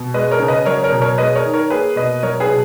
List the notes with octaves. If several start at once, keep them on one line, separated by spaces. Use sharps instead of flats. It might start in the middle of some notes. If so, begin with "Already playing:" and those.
Already playing: B2
G#3 B4 D#5
A#4 C#5
C#3
B4 D#5
F#3 A#4 C#5
A#4 C#5
B2
A#4 C#5
G#3 B4 D#5
A#4 C#5
D#3
A#4 C#5
A#3 G#4 B4
B2 B4 D#5
F#3 A#4 C#5
G#4 B4
B2